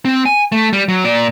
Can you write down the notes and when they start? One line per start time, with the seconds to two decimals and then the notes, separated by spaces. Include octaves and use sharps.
0.05 C4
0.26 G#5
0.52 A3
0.73 G3
0.88 F#3
1.04 A#2 D5